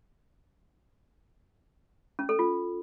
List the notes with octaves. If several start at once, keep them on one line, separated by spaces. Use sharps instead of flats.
C#4
A4
F4